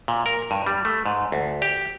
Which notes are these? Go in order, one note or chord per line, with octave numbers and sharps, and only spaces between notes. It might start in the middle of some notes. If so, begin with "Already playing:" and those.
A#2
A#4
G2
G3
A3
G#2
D2
G4